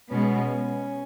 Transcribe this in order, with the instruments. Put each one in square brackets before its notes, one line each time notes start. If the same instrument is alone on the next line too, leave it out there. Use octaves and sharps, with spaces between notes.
[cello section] B2 G#3 B3 [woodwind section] C#4